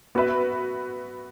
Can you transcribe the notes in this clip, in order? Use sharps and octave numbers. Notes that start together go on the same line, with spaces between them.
B3 F#4 B4 E5